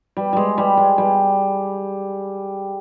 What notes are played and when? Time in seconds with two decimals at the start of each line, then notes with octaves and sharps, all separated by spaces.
0.17 G3
0.33 G3 G#3
0.58 G3
0.77 G#3
0.98 G3